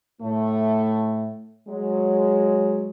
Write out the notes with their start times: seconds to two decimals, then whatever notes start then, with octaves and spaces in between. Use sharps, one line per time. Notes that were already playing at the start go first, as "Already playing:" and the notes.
0.22 A2 A3
1.69 F#3 G#3